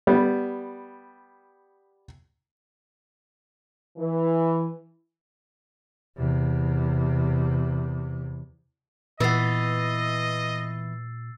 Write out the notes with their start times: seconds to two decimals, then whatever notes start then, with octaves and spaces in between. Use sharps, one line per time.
0.07 G3 B3
3.97 E3
6.17 E2 C3
9.20 A#2 E3 B3 D#5 E6 A6 C7